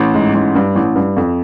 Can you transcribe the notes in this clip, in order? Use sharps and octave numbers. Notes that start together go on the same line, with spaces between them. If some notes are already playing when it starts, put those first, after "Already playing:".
Already playing: A1
G#2
A1
G2
A1
G2
F2